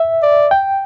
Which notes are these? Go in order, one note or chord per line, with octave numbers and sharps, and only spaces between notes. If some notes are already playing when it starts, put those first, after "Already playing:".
Already playing: E5
D5
G5